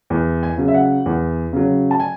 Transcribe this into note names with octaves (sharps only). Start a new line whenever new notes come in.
E2
G#5
C#3 F#3
E5
F#5
E2
C#3 F#3
A5
G#5